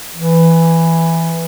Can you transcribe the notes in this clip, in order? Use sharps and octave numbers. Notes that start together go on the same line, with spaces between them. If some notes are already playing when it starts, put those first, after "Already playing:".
E3